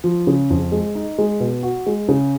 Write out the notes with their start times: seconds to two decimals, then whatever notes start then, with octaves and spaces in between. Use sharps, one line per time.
0.04 F3
0.27 C#3
0.50 F2
0.72 G#3
0.95 D#4
1.18 G#3
1.40 B2
1.63 F#4
1.86 G#3
2.08 C#3